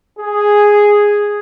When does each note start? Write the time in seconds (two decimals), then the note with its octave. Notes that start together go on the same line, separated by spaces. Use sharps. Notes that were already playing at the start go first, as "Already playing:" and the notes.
0.18 G#4